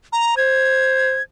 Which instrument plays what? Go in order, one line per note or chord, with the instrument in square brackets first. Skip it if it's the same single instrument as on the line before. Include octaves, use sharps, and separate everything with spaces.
[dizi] A#5
[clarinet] C5 [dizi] G#6